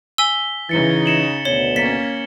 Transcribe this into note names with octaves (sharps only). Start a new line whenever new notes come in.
G#5 E6 B6 G7
C#3 E3 D#4 A6 C#7 G7
C#7 E7 F#7
D2 B2 C#5 G7
A#3 C#4 A6 B6 C#7